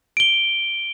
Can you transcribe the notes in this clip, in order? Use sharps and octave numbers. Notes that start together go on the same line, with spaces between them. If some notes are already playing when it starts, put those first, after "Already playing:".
D7 G7